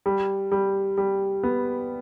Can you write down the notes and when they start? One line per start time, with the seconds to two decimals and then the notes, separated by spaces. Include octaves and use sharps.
0.06 G3
0.52 G3
0.98 G3
1.43 B3